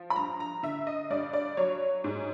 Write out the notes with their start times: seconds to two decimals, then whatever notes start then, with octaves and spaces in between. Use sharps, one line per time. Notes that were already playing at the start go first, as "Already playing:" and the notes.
Already playing: F3
0.10 B5
0.16 G2 A#5
0.40 A#5
0.63 D3 E5
0.87 D#5
1.10 G2 D5
1.33 D5
1.57 F#3 C#5
2.04 G#2